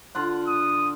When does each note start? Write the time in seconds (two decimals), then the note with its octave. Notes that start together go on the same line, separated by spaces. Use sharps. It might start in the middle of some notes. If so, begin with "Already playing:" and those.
0.15 D3 F4 F#5
0.47 D#6